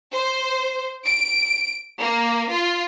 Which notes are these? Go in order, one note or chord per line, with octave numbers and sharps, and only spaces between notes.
C5
D7
A#3
F4